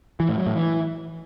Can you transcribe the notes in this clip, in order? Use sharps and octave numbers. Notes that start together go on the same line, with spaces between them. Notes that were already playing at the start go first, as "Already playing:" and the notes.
E3
A2
F#3
A2
E3